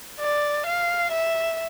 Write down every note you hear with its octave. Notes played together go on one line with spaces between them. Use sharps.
D5
F5
E5